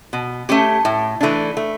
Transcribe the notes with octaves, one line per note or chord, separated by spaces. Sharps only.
B2
A3 C#4 G4
A2
E3 A3 D4
A3